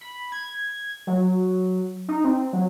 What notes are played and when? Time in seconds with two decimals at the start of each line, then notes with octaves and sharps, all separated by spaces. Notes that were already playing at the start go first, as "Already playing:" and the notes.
0.01 B5
0.32 G#6
1.07 F#3
2.08 D#4
2.24 C4
2.53 F#3